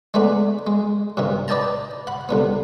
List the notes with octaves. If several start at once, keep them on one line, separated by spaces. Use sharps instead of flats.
G#3 A3 B3 D4
G#3
G2 C3 D#3
B4 D5 D#5 G5 A5 A#5
F#5 B5
C2 D3 B3